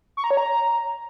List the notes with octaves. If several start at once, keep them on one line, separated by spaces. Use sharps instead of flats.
C#6
A#5
C#5
A#5